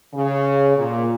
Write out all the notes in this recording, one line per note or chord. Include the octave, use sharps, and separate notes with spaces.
C#3
A#2